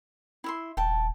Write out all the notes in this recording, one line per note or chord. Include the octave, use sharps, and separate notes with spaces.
E4 E5 C6
D#1 G5 A5